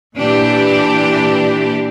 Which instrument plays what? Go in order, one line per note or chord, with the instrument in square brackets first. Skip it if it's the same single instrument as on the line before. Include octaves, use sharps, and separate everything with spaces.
[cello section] A#2 E3 D4 G4 D5